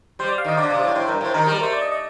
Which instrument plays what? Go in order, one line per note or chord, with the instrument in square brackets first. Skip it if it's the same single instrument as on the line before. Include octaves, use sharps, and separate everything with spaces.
[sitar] G3 [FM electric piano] C5
[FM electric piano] D5
F5
[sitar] D#3 [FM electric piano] D#5
[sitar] D3 [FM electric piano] D5
[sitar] C3 [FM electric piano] D5
[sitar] A2 [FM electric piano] D5
[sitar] A2 [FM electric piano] C5
[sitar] G2 [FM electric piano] A#4
[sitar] A2 [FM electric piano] C5
[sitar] D#3 [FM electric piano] A#4
[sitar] G3
[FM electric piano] A#4
[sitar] A3 [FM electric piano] C5
[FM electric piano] D5
D#5
D#5